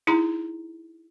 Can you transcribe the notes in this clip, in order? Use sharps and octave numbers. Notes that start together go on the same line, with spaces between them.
D#4 E4 G#4 A#5